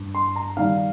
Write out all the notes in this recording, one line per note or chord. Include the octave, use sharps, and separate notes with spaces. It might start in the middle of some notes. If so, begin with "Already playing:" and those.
Already playing: G2
C6
A#5
D#3 G3 D#4 F5